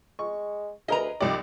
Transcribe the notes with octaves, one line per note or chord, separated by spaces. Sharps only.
G#3 C#6
D2 G#4 A#4 B4 D#5 A#5
C2 F3 G3 D#4 G4 D5